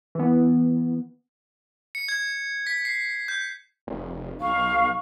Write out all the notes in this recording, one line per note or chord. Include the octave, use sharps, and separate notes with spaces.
E3 B3
C#7
G#6
B6
C7
G6
F1
B1 F5 C#6